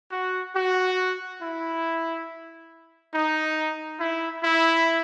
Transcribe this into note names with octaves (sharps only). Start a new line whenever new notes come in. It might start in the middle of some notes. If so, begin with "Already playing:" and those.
F#4
F#4
E4
D#4
E4
E4